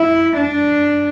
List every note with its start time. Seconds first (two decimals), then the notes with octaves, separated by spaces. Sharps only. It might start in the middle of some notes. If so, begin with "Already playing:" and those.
Already playing: E4
0.37 D4